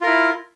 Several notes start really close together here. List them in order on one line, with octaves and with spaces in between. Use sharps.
F4 A#4 E4